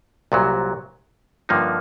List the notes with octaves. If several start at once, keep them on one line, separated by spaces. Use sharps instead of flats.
C2 A#2 F#3
G2 D3 F3 A#3 D#4